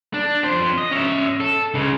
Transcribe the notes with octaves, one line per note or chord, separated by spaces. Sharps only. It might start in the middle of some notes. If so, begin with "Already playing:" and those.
D4
F2 C5
D#5
C#4 E5
A4
C#2 C#3